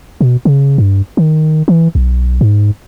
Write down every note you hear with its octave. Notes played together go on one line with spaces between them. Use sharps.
B2
C#3
G2
D#3
E3
B1
G#2